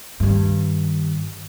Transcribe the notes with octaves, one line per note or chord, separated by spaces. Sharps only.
G2 D#3